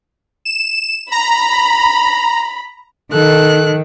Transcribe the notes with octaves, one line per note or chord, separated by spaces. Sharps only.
E7
A#5 B5
D#3 A4 F#6